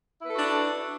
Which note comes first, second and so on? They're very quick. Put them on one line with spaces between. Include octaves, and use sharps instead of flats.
E4 B4 A4 F#4 D4